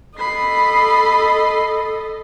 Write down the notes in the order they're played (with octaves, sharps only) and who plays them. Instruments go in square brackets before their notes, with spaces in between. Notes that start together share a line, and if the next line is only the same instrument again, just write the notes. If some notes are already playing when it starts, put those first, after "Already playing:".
[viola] A4 D#5 [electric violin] B5 C7